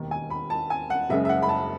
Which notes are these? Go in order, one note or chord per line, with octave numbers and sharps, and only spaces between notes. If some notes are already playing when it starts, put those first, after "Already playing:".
Already playing: E1 D#2 D#3
G#5
B5
A5
G#5
F#5
F#1 F#2 C#3 G#3 E5
E5
F#5
B5
A5